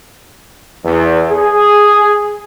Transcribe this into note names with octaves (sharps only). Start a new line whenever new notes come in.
E2
G#4